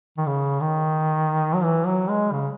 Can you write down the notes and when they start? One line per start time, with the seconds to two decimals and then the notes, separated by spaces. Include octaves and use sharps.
0.18 D#3
0.27 C#3
0.61 D#3
1.55 F#3
1.64 E3
1.86 F#3
2.09 G#3
2.32 C#3